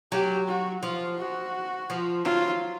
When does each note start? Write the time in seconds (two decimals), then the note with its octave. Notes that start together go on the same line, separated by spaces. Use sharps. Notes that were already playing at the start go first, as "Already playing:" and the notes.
0.12 F#3 G4
0.48 F#4
0.83 F3 F4
1.18 F#4
1.90 F3
2.25 F#3 F4